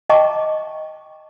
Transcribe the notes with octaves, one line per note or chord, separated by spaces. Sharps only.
D#5 G5 A5 A#5 C#6 D6